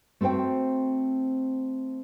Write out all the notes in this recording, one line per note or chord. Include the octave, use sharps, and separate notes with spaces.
A3 C4 F#4 C5 G5